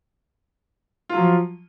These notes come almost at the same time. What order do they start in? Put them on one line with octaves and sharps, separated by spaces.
F4 F#3 F3